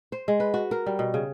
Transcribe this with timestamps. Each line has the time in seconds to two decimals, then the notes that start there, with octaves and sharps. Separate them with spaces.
0.12 C5
0.28 G#3
0.40 B4
0.54 F#4
0.71 A#4
0.86 G3
0.99 B2
1.14 C#3